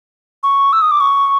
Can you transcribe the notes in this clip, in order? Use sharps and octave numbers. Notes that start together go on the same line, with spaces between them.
C#6
E6
D#6
D6
C#6